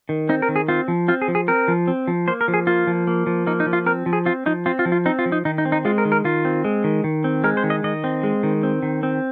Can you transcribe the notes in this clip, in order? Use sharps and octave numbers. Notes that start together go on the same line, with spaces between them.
D#3
C4 D#4
A#4
D#3
G#4
C4 F4
F3
C4 F4
G#4
F3
G#4
C4 A#4
F3
C4
F3
A#3 C5
A#4
F3
G#4
A#3 F4
F3
A#3
F3
A#3 D#4
D#4
F3
F4
C4 A#4
F3
G#4
C4 F4
F3 D#4
C4 F4
F4
F3
F4
C4 D#4
F4
F3
D#4
D#3 D#4
D#4
C4
D#4
G#3 F4
A#4
D#3
A#4
D#3 F4
C4
G#3
D#3
D#3
C4
G#3 A#4
C5
D#3
D#5
D#3 D#5
C4
G#3
D#3
C4
D#3
C4